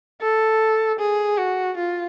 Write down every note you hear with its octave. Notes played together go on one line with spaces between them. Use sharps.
A4
G#4
F#4
F4